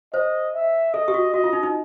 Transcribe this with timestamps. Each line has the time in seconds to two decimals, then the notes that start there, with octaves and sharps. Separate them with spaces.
0.13 C5 D#5
0.54 E5
0.94 A4 D#5
1.08 G4
1.14 F#4
1.34 F#4 D#5
1.44 F4
1.53 D#4
1.63 D#4